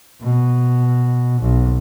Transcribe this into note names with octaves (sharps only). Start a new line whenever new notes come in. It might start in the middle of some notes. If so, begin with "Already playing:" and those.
B2
B1